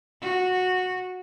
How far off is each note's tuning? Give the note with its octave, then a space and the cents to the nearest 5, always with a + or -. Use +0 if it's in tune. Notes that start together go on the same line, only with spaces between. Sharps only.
F#4 -10